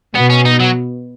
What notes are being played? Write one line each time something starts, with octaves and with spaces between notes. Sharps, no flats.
B2 B3
C#4
D#4
F#3